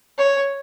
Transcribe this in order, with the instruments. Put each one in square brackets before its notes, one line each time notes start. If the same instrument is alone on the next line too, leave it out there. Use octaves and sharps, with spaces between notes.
[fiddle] C#5